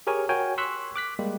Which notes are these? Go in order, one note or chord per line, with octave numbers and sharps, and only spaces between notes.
G4 G#4 A#4 C#5 G#5
F#4 A#4 C#5 G5 G#5
C6 C#6 E6 F#6 B6
D6 F#6 B6
G3 G#3 A#3 G4